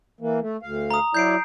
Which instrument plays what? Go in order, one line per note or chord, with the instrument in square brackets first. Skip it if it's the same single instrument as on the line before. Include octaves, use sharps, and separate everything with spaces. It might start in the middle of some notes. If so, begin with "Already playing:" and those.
[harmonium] E3 A#3
A3
D2 F5
[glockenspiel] A#5 D#6
[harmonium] F#3 E4 D5 [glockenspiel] G6 C7 D7